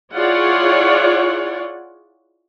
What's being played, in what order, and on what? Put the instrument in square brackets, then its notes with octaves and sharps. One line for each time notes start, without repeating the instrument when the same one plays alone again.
[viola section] E4 F4 G#4 C#5 D5 F#5